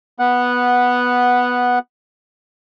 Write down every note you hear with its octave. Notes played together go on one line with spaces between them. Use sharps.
B3 F#5